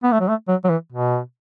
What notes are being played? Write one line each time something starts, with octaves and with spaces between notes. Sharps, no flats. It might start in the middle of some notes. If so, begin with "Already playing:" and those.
B3
A3
F#3
A3
F#3
F#3
E3
B2